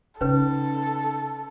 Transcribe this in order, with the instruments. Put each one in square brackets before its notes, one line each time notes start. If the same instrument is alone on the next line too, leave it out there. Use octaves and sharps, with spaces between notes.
[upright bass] C#3 D#4 [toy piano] C#4 B4 [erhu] A4